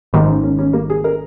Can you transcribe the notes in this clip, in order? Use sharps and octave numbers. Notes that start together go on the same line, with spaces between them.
G#1 G#2 D#3 A#3
C#4
C#4
C#4
A#3
G#4
A#4